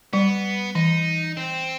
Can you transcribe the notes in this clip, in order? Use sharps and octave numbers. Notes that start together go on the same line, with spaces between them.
G3 B3
E3 D#4
C4